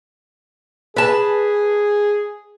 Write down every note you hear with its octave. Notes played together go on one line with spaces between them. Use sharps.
G#4 B4 A5